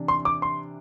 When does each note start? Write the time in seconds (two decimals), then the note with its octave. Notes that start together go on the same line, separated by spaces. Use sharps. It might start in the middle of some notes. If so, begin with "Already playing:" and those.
Already playing: C3 E3 D4
0.08 C6
0.25 D6
0.42 C6